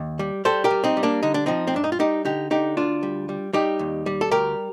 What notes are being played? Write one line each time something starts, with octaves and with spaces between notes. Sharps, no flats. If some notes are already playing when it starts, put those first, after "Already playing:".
Already playing: D#2
G3
G3 A4 C5
G4 A#4
G3
C4 D#4
G3
A#3 D4
D3 D#4
D4
F3 C4 D#4
C4
G2 D4
D#4
F4
G3 D#4 G4
D3 D#4 G4
D3 D#4 G4
D2 D4 F4
G3
G3
G3 D#4 G4
D#2
G3
A4
D2 G4 A#4